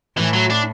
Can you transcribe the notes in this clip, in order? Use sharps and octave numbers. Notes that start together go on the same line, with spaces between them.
A2 E3
F#3
D4